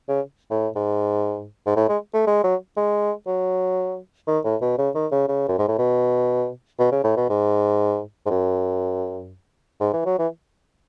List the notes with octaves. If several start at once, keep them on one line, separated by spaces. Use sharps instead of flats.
C#3
A2
G#2
G#2
A2
G#3
A3
G#3
F#3
G#3
F#3
D#3
A2
B2
C#3
D#3
C#3
C#3
F#2
G#2
A2
B2
B2
C#3
A2
B2
G#2
G#2
F#2
G#2
E3
F#3
E3